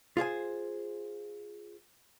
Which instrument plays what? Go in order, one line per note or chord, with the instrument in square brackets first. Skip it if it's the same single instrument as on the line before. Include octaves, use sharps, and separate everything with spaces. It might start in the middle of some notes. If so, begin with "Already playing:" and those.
[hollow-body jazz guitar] F4 G#4 C5 G#5